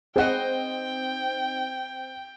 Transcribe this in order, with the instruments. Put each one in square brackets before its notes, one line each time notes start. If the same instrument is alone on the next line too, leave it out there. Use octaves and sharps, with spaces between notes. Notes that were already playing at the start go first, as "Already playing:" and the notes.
[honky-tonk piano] C4 [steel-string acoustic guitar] D#4 C5 D#5 [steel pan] G#4 F#5 [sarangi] G5